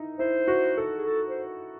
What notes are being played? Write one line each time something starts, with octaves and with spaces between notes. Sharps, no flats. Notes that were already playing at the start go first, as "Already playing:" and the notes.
Already playing: D#4 E4
E4 C5
F#4
A4
G#4
A4
C5